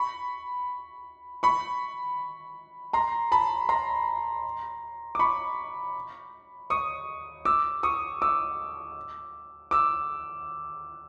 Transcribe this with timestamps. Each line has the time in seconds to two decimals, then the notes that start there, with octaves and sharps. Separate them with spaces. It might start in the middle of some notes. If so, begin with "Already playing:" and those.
Already playing: B5 C#6
1.43 B5 C#6
2.93 A#5 C6
3.32 A5 B5
3.69 A#5 C6
5.15 D6
5.19 B5 C#6
6.70 C#6 D#6
7.45 D6 E6
7.83 C#6 D#6
8.22 D6 E6
9.71 D6 E6